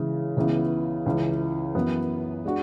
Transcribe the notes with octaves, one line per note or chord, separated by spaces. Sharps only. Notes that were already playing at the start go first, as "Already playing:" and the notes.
Already playing: C#3 E3 G#3
C#2 C#3 E3 B3
C#2 C#3 E3
F#2 E3 B3
G#3 D4 F#4